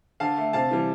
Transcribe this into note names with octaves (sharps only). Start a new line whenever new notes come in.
D3 F5 A5
A3
C3 F5 A5
E3 G3